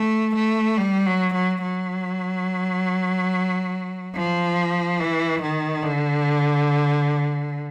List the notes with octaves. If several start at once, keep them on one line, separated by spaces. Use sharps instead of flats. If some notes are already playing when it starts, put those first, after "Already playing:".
Already playing: A3
A3
G3
F#3
F#3
F#3
F3
E3
D#3
D3